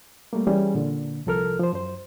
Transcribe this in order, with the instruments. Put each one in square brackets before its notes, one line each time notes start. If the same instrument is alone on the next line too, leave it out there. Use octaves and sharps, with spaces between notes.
[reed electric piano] G3 A3 A#3
E3 G3 C#4 G#4
A#2 D3
C2 F3 A4 A#4 F6
F3 C5
F#2 C5